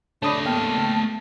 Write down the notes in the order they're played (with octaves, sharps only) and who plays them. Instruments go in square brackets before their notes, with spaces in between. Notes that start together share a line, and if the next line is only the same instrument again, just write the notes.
[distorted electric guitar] A3 D#5 [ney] D4 [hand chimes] C#5 D#6 [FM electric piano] A5 B5
[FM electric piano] A#3 G5 F6 [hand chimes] B3 [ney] A5